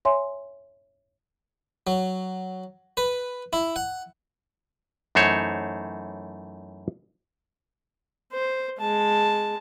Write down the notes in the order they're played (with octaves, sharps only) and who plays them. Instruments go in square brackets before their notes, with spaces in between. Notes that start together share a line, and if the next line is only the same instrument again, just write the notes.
[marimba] C#5 E5 G#5 C6
[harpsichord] F#3
B4
E4
F#5
[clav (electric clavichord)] F#2 E3 A3 D#4 C5 C#5
[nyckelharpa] C5
G#3 A5